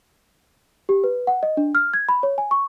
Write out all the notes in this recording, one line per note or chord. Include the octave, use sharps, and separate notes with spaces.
G4
B4
F#5
D#5
D4
F6
G#6
B5
C#5
G#5
C#6